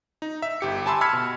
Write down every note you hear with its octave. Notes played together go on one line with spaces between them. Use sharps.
D#4
E5
G1 G4 C#7
G#5 A5 B5 C6 E6
B5 E6 F6 G#6 B6 C#7
B2